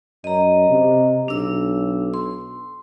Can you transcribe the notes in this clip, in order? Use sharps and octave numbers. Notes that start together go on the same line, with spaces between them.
F#2 D#5 A#5
C3
B1 D4 E6
C6